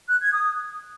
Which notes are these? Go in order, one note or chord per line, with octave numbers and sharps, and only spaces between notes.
F#6
G#6
D#6